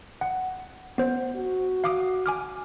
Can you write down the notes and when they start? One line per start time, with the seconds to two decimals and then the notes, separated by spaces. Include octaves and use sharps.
0.21 F#5
0.98 B3 C5
1.36 F#4
1.84 F5 D6 D#6
2.26 G#5 D6 F6